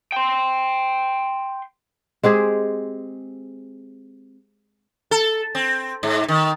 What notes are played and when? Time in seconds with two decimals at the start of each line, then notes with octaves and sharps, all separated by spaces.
0.12 G5 C6
2.23 G#3 C4 G4 G#4
5.11 A4
5.55 C4
6.03 G#2
6.28 D#3